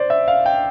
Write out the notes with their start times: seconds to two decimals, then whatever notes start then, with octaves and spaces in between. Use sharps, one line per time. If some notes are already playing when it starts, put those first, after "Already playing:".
Already playing: C5 D5
0.10 E5
0.28 F5
0.46 G5